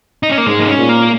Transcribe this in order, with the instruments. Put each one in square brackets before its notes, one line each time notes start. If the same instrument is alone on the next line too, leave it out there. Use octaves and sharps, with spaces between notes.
[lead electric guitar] D#4
C#4
A#3
[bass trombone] G#2 [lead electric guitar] G#3
[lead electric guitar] A#3
C#4
[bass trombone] A#2
[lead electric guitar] A#3